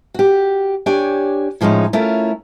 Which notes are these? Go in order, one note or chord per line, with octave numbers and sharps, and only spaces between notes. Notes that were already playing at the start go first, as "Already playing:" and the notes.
F#4 G4
D4 G4 C#5 G#5
A2 F3 G#3 C#4 D#4
A3 C#4 E4 F4 A#4